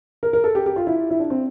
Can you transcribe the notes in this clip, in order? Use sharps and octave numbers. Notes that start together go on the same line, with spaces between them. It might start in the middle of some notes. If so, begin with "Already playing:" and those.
A#4
A#4
A4
G4
G4
F4
E4
E4
D4
C4